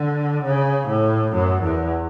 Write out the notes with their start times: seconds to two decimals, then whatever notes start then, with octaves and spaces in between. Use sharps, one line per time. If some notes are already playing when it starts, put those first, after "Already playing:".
Already playing: D3
0.44 C#3
0.88 A2
1.33 F#2
1.63 E2